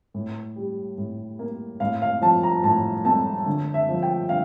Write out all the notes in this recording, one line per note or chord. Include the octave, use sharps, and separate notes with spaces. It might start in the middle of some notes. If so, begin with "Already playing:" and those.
A2
G3
A2
A#3
A2 F5
F5
F3 A5
A#5
A2 A5
A3 A5
D3
E5
F3
G5
D3 F5